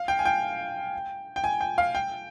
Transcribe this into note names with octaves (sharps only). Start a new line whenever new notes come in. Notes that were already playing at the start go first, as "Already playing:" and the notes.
Already playing: F5
G5
G#5
G5
G5
G#5
G5
F5
G5